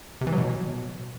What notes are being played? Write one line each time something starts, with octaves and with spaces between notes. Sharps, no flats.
C3
E3
F#3
B2